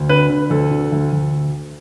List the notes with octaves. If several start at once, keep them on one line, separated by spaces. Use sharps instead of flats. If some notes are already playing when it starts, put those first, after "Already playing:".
Already playing: D2
D3 B4
D3
D2 A4
D3
D2
D2